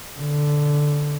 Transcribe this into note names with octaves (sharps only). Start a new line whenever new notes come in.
D3